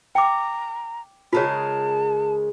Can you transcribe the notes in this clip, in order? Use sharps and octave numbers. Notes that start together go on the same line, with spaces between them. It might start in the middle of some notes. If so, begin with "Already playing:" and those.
G5 A#5 D6
C#3 G#3 F4 A#4 C#5 A5